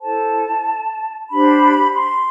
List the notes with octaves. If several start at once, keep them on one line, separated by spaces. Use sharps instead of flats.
E4 A4 C5 A5
D4 G4 C5 B5
C6